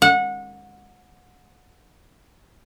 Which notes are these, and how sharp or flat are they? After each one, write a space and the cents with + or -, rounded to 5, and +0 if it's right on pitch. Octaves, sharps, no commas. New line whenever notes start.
F#5 -25